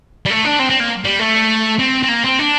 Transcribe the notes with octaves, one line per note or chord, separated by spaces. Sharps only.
G3
A3
D4
C4
C4
A#3
G3
A3
C4
C4
A#3
C4
D4